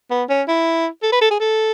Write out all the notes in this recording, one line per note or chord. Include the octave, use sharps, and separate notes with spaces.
B3
C#4
E4
A4
B4
A4
G#4
A4